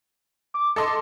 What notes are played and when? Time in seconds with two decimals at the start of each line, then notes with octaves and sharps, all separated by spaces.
0.54 D6
0.76 A4 D#5 C6